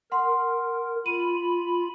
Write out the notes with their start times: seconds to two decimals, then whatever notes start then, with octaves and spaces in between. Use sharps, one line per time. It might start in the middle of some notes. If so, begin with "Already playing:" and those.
0.12 A#4 F#5 C6
1.06 F4 B5 D#7